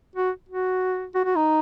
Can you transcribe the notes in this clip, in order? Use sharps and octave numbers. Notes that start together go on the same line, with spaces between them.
F#4
F#4
F#4
F#4
D#4